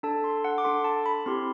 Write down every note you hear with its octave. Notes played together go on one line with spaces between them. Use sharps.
D4 A4 A5
C6
F#5
D6
D4 A4 C6
A5
B5
C4 E4 G4 C6